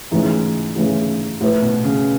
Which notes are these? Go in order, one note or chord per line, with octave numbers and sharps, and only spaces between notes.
G#2 C#3 E3 A3
C#3 E3 A3
A2 A3 E4 B4
B2
C#3